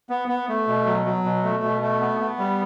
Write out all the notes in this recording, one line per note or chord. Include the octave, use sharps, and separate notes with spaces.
B3
B3
A3
B2
F#3
F#3
B2
A3
B2
A3
B3
B3
G3